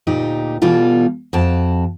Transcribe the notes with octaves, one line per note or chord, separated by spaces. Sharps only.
D2 A#2 D#4 G4
B2 E3 G3 F4 A4
F2 F#4 F5 G5 A5